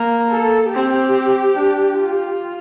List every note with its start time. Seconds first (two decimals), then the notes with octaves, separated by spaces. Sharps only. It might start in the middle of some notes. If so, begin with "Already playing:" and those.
Already playing: A#3
0.32 A4
0.73 C4 G4
1.55 D4
1.97 F4